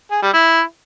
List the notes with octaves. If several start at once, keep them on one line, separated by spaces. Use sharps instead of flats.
G#4
G3
E4